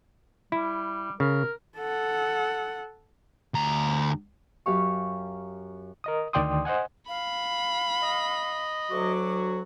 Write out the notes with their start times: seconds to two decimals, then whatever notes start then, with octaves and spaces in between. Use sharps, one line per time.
0.52 G3 E4
1.20 C#3 A#4
1.77 A4 F#5
3.54 D2 A#5
4.66 F#2 G4 F5 C#6
6.04 A#4 D#5 D#6
6.33 D2 D#3 D5 G5 C6 D#6
6.65 C5 D#5 F#5 G#5
7.08 F5 B5
8.02 D#5
8.91 D2 F#3 F#4 D6